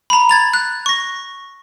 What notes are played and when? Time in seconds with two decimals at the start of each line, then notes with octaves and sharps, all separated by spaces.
0.10 A#5 B5
0.29 G#6 A6 F7
0.54 F#6
0.86 C#6 A#6